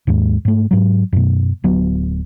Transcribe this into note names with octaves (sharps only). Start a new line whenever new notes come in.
D#2 G#2 G#3
G#2 A3
G#2 F#3
F#2 B2
D1 F#3 B3